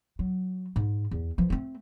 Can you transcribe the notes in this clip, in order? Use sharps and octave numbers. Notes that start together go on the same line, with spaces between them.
F#3
G#2
E2
E3 F3
A3 C4